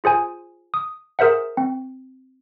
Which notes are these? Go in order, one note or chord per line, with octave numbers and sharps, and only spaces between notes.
F4 G#4 C5 G#5
D#6
G#4 A#4 C5 E5 F#5
C4